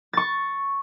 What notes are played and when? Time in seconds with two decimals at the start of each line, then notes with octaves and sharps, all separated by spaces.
0.13 C#6 A6